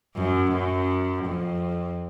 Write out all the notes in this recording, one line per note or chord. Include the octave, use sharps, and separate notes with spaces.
F#2
F#2
F2